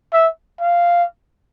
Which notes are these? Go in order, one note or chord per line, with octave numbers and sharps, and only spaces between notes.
E5
F5